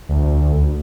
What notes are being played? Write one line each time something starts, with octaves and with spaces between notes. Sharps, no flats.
D2